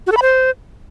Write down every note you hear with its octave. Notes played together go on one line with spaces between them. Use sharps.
F#4
A4
B5
C5